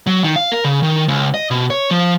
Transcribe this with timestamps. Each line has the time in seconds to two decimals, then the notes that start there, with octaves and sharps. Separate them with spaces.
0.07 F#3
0.24 D#3
0.36 F5
0.52 A#4
0.65 C#3
0.83 D#3
1.08 C#2
1.34 D#5
1.51 B2
1.70 C#5
1.91 F3